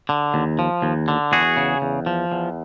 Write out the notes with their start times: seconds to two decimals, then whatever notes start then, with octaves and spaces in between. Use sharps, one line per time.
0.09 D3
0.34 D#2
0.59 F3
0.82 D#2
1.08 D3
1.32 E2 F#4 G#4
1.57 C#3
1.82 E2
2.06 F3
2.32 E2